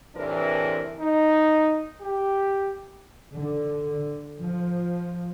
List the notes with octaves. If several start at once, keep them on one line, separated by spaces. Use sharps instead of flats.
A2 C3 E3 D4 A#4 B4
D#4
G4
D3
F3